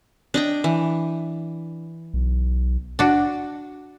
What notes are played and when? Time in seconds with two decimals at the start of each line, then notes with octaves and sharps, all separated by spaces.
0.34 D4 D#5 G5
0.64 E3
2.14 B1
2.99 D4 F#4